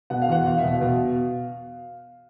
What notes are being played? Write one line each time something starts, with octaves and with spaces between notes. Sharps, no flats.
B2 F#5
F5
E2 F#5
E2 F5
E5
B2
F5
B2